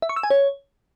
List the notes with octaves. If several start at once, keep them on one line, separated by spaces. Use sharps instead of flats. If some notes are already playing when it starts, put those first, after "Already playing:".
E5
C#6
E6
G#5
C#5